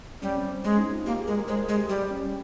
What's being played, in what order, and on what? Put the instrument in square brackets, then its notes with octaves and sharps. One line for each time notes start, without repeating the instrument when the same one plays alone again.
[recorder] G3 [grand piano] C#4
[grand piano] C4
C4
[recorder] G#3 [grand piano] C#4
[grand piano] D#4
F4
[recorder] A#3 [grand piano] G4
[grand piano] G#4
[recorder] G#3 [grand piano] A#4
[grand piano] A#4
[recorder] G#3 [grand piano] C5
[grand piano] G#4
[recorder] G#3
[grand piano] G4
[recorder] G3 [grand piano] G4
[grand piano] C#4